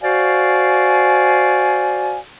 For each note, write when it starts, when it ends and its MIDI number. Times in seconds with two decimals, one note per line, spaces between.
0.02 2.19 66
0.02 2.19 72
0.02 2.19 74
0.02 2.19 77
0.02 2.19 80